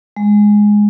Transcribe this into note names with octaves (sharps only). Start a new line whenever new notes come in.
G#3